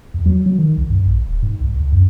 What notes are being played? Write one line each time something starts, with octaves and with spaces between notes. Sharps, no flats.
E2
F#3
F#3
D#3
C2
G2
A#1
D#1
G#2
C2
C#2
F#2